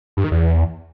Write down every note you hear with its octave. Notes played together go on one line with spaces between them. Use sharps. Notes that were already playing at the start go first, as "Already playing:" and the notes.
G2
D#3
E2